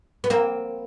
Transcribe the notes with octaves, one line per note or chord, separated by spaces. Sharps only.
B3
A#3 C4